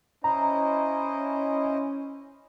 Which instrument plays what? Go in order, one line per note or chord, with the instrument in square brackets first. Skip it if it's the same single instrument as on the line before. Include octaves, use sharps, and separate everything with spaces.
[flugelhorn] C#4 [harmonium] E4 C5 D#5 [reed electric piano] A#5